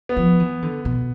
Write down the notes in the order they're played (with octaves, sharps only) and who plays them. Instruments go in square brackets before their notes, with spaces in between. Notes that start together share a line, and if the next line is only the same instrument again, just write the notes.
[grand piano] B3
[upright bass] F3
E3
D3
B2